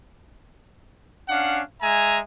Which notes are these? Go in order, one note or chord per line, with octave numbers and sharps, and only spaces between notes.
C#4 D4 F5 F#5
G#3 E5 G#5 A#5